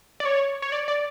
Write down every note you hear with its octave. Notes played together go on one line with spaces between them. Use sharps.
D5
C#5
C#5
D5
D5